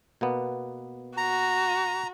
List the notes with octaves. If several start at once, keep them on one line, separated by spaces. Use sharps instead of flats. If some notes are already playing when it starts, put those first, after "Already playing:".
B2 A#3 B3
F#4 A#5